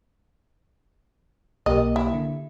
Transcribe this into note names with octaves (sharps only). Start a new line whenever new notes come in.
B1 A#3 G4 D#5
E4
D3